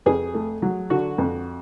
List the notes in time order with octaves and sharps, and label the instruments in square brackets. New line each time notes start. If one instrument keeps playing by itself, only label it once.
[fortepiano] F2 G#4
A3
F#3
D3 F#4
F2